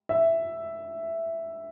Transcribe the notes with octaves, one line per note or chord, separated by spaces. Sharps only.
E5